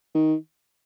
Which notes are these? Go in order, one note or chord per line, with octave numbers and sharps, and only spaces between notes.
D#3